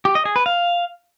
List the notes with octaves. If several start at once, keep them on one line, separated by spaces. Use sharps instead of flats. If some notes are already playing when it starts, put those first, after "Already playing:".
G4
D#5
G#4
B4
F5